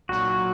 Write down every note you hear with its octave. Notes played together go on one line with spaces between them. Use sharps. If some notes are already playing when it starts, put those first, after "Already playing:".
B1 A#2 F#3 F#4